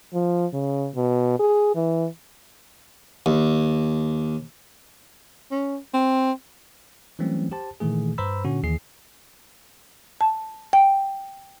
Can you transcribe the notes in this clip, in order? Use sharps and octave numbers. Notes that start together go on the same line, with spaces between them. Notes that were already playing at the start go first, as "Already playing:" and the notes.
F3
C#3
B2
G#4
E3
D#2
C#4
C4
E3 F#3 G3 A3 C4 C#4
G4 C5 A5
A#2 D#3 E3 A3 G#4
G2 B4 C5 A#5 B5 E6
A#2 D3 C#4 F#4
D#2 E3 G#4 C7
A5
G5